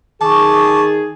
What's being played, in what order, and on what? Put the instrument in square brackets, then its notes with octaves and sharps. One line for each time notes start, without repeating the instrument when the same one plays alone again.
[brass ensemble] D#3 G#4 [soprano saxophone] A5 [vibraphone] C#6 D6